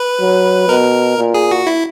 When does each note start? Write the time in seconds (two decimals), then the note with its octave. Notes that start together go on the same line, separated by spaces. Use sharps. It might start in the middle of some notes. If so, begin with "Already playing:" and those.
Already playing: B4
0.21 F#3
0.69 B2 A#4
1.18 A#2
1.34 G#4
1.51 F#4
1.67 E4